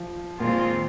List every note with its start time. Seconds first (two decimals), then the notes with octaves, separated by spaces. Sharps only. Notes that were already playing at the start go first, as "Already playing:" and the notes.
Already playing: F3
0.40 A#2 D#3 G#3 C4 F4